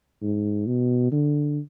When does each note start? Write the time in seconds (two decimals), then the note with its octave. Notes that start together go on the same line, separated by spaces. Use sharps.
0.22 G#2
0.67 B2
1.12 D3